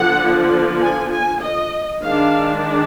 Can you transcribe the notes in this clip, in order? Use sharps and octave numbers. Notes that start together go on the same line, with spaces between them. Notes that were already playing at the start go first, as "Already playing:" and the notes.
Already playing: D3 F3 B3 F#5
G#5
G#5
D#5
D#3 G#3 D4 F5